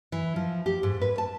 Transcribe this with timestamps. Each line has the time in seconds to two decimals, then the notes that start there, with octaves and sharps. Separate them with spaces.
0.12 E3
0.36 F3
0.66 G4
0.83 G#2
1.01 B4
1.18 A5